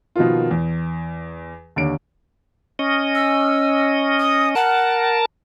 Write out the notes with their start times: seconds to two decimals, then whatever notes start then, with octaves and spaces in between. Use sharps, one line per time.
0.16 B2 D#3 F3 A#3 F4
0.51 E2
1.76 D#2 D3 C#5 D7
2.79 C#4 D#5
3.15 E6
4.19 D#6
4.55 A#4 F#5 A5